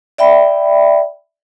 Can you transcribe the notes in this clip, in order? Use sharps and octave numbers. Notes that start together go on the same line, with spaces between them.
D5 E5 G5 B5